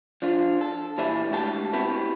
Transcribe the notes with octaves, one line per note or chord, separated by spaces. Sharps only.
F3 D4 F4
A4
A#2 E3 G3 B4 E5
D2 G#2 F#4 G4 A5
B3 C4 E4 F#4 G4 B4